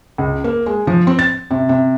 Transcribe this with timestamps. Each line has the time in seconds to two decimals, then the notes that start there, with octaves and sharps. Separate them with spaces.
0.18 C#2
0.44 A#3
0.66 G#3
0.87 F3
1.07 C4
1.19 A6
1.51 C3
1.69 C3